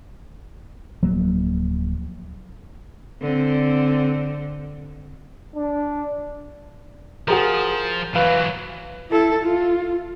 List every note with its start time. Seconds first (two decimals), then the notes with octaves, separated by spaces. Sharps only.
1.03 D1 F3 F#3 A#3
3.21 D3 C4
5.55 D4
7.28 F3 F#4 G#4 A#4
8.15 E3 F#3 B4 F5
9.11 E4 A4
9.44 F4